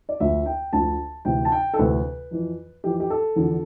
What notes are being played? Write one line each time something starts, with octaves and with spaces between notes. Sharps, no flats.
D5
D2 D3 F3 E5
G5
D2 D3 F3 A5
D2 C3 E3 G5
A5
G5
A4
D2 C3 E3 B4
F2 E3
F2 E3 G4
G4
A4
E2 D3 F3